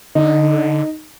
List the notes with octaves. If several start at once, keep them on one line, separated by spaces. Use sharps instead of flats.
D3 D#4